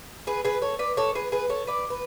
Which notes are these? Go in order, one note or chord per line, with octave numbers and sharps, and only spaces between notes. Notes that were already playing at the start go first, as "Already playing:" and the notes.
G#4 B4
G#4 B4
A4 C#5
B4 D5
A4 C#5
G#4 B4
G#4 B4
A4 C#5
B4 D5
B4